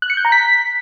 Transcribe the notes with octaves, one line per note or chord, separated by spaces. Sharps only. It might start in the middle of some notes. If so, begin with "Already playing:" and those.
F#6
C#7
G6
A#5
B6